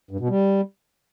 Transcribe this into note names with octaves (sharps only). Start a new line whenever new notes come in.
G2
B2
G3